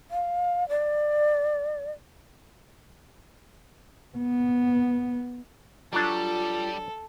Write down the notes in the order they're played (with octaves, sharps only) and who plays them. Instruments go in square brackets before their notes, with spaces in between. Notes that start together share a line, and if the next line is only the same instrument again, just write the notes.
[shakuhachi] F5
D5
[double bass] B3
[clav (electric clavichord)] F#3 D4 [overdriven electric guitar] G3 [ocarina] F4 [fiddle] A4